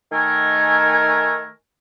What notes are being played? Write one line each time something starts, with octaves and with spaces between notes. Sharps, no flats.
D#3 A3 A#4 G#5